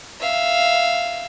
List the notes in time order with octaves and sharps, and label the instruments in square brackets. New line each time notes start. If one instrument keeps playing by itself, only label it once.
[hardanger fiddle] E5 F5